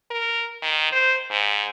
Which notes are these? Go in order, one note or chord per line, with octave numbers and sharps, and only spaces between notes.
A#4
D#3
C5
G#2